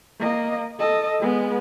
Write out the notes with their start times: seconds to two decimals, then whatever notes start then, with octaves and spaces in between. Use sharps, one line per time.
0.19 A#3 D#5
0.79 A4 D#5
1.20 G#3 B3